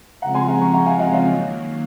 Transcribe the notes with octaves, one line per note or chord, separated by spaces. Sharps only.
C#3 F3 G#3 C4 F4 F#5 A#5
G#5 C6
F#5 A#5
A#5 C#6
F#5 A#5
F5 G#5
D#5 F#5
C#5 F5
D#3 F#3 A#3